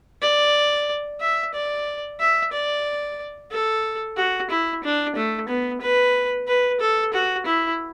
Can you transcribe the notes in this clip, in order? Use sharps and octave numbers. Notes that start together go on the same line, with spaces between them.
D5
E5
D5
E5
D5
A4
F#4
E4
D4
A3
B3
B4
B4
A4
F#4
E4